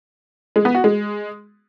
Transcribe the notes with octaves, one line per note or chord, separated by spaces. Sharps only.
G#3
B3
F#4
G#3